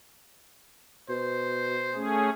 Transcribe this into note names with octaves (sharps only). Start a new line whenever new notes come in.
B2 C5
A3 C#4 G#4